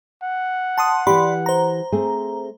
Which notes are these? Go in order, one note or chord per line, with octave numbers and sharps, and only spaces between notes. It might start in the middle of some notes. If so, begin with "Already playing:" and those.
F#5
A5 C6 D#6
E3 G4 D5 B5 C6
C5 A#5
A3 C4 G#4